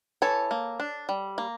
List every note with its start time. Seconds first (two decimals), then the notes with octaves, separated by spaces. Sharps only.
0.22 E3 A4 C#5
0.51 A#3
0.80 D4
1.09 G3
1.38 A#3